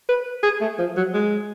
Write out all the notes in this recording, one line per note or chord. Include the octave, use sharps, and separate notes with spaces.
B4
G#4
A3
F3
F#3
G#3